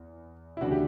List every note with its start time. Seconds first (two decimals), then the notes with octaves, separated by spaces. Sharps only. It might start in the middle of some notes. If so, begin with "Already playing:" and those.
Already playing: E2
0.57 E4
0.61 D2 C#3 E3 D4 F#4
0.71 G4